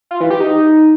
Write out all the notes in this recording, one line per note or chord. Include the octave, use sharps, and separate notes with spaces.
F4
E3
G4
D#4